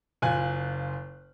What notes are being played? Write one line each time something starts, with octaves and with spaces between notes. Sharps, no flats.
F#1 F4 G#5 F#6